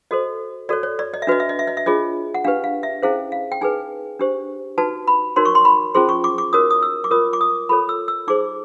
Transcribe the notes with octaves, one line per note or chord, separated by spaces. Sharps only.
F#4 A4 C5 D#5
F#4 A4 C#5 D5
C#5
D5
D#5
E5
D4 F#4 B4 D#5
E5
D#5
E5
D#5
E5
D4 F4 G#4 C#5 D#5
F#5
D4 G4 B4 F5
F5
E5
C#4 E4 G#4 C5 F5
F5
G5
D#4 G#4 B4 G#5
D4 G4 C5
D#4 F#4 B4 A5
B5
D#4 F#4 A#4 C#5 C6
C#6
C6
B5
C#4 F4 G#4 C5 C6
C#6
D6
D6
D#4 F#4 A#4 C#5 D#6
D#6
E6
D6
F4 A#4 C#5 D#6
D6
D#6
F4 A4 C#5 B5
E6
E6
D#4 G#4 C5 D6